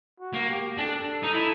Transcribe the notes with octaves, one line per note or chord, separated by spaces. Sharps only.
F#4
A#3
G4
D4 A4
D#4
E4